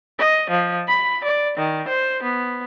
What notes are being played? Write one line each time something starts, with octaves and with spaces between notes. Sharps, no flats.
D#5
F3
B5
D5
D#3
C5
B3